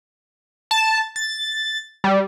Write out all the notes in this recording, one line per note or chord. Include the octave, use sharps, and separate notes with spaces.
A5
A6
G3